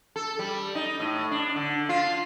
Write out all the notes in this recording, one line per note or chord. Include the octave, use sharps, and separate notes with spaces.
A4
G3
D#4
A2
D4
D3
F4